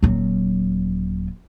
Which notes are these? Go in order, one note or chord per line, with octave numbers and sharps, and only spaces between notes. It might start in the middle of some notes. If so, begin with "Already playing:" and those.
D#1 F#3